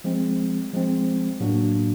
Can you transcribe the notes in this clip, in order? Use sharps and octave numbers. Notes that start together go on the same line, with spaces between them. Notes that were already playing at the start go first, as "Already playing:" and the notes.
F3 G#3 C4
F3 G#3 C4
A2 F#3 A#3 D4 F#4